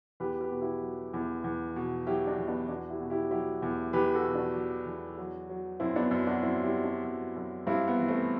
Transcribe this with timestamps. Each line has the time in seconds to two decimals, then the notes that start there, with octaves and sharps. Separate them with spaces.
0.20 E2 G4 B4
0.41 G4 B4
0.51 B2
0.61 E4 G4
0.82 F#3
1.14 E2
1.44 E2
1.76 B2
2.07 F#3 E4 G4
2.27 D4 F#4
2.38 E2
2.48 B3 D4
2.68 E2 D4 F#4
2.90 E4 G4
3.00 B2
3.10 E4 G4
3.31 F#3 E4 G4
3.62 E2
3.93 E2 G4 B4
4.14 F#4 A4
4.25 B2
4.35 D4 F#4
4.55 F#3
4.86 E2
5.18 F#3
5.50 F#3
5.80 F#2 C4 E4
5.96 B3 D4
6.11 F#2
6.27 D4 F#4
6.42 F#3 C4 E4
6.63 E4 G4
6.74 F#3
6.84 D4 F#4
7.04 F#2
7.36 F#2
7.67 G2 C4 E4
7.88 B3
7.98 E3
8.08 A3 C4